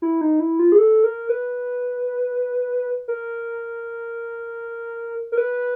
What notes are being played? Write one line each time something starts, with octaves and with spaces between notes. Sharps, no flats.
E4
D#4
E4
F4
G#4
A4
A#4
B4
A#4
A#4
B4